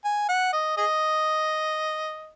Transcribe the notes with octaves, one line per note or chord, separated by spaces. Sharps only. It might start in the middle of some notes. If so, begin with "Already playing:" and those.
G#5
F#5
D#5
G#4 D#5